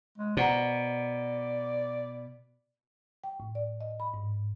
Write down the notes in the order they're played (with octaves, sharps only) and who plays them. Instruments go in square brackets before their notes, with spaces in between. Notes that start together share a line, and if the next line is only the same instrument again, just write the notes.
[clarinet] G#3
[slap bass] B2 [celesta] C5 F#5 A#5 [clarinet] D5
[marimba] G5
A2
D5
D#5
B5
G#2